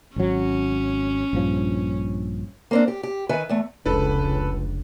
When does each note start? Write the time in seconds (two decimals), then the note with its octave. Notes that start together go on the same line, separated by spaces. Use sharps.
0.16 G#1 F#3 C#4
1.33 A#1 G2 F3
2.71 A#3 C4 D4
2.88 G4
3.03 G4
3.29 D#3 B4 E5 G#5
3.49 E2 A3
3.85 F1 C#2 D4 A4 B4